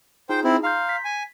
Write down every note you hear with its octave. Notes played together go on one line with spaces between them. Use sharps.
D#4 F4 G#4 C5 G5
C4 E4
F5 A#5 C6 G6
B6
G#5